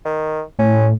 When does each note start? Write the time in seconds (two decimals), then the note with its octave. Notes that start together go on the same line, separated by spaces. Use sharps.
0.05 D#3
0.59 A2 C#4